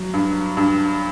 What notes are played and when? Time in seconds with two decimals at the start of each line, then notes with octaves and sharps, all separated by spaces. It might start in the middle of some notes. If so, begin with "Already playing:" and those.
Already playing: F#3
0.14 G2
0.57 G2